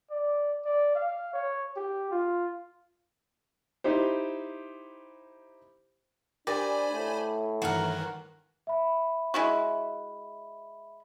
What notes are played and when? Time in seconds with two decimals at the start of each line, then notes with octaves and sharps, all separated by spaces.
0.11 D5
0.66 D5
0.95 F5
1.33 C#5
1.77 G4
2.12 F4
3.84 D#4 E4 G4 C5
6.47 D4 G4 A#4 C5 D5 G5 G#5 B5
6.91 A2
7.62 G2 D#3 E3 F#4 A#4
8.67 E5 B5
9.34 G#3 E4 F#4